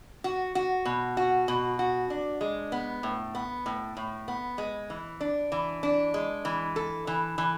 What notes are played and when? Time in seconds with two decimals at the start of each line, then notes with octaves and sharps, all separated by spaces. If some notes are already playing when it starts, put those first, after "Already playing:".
0.24 F#4
0.55 F#4
0.85 B2
1.17 F#4
1.48 B2
1.79 F#4
2.10 D4
2.41 G#3
2.72 B3
3.03 A2
3.35 B3
3.66 A2
3.97 A2
4.28 B3
4.58 G#3
4.90 E3
5.21 D4
5.52 E3
5.83 D4
6.14 G#3
6.45 E3
6.76 A4
7.07 E3
7.38 E3